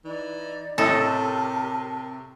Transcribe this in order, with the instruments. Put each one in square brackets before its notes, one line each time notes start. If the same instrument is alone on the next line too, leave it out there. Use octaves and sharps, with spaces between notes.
[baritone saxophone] E3 [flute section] D#4 D5
[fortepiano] A2 A3 D#5 [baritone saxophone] C3 [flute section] G4 A#4 A5 [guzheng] A4